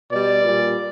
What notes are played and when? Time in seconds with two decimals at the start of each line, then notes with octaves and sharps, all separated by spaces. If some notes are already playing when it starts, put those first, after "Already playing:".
0.11 B2 G3 D5
0.44 A#2 G3